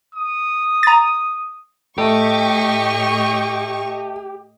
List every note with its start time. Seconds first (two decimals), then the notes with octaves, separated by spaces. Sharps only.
0.15 D#6
0.83 A#5 A6
1.98 A2 A3 G4 D#5 C#6